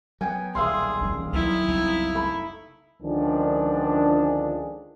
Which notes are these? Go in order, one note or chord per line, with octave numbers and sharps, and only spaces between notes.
F#3 A#3 B3 G5 G#5
D#1 B1 G#4 E5 F5 C6
E3 C#4
F#3 B3 D#4 E4
F#1 C2
A3 B5
C#2 D3 D#3 F3 D4 G#4